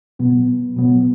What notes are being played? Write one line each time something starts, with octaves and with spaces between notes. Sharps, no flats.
B2 F#3 B3
B2 F#3 B3